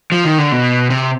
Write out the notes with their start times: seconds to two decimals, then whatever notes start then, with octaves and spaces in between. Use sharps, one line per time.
0.12 F3
0.25 D#3
0.38 D3
0.52 B2
0.90 C3